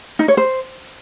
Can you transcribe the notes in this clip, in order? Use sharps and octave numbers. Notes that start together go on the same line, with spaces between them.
D#4
C#5
C5